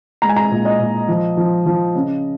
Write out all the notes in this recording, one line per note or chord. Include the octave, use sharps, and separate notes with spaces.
G#3 A#5
G#5
A#5
A#2
D#5
A#2
F3
F3
F3
C#3